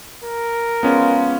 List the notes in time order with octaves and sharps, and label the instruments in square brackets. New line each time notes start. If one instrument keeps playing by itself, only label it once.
[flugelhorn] A#4
[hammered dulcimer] F3 G#3 [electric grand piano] B3 C#4